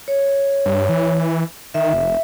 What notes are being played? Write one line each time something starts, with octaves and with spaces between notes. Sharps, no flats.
C#5
G2
E3
D#3 E5
F1